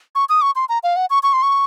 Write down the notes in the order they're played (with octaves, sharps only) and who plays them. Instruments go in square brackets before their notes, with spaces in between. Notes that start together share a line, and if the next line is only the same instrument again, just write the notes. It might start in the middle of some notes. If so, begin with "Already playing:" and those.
[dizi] C#6
D#6
C#6
C6
A#5
F5
F#5
C#6
C#6
C6
C#6